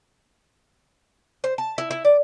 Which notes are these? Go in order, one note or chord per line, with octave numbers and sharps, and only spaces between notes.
C5
A5
E4
E4
D5